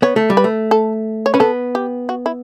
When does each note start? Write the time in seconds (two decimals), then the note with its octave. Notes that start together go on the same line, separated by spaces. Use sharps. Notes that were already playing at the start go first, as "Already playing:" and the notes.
0.02 B3 C#5
0.16 A3
0.30 G3
0.37 B4
0.44 A3
0.71 A4
1.26 C#5
1.34 C#4 B4
1.40 B3 A4
1.75 G4
2.09 F#4
2.26 E4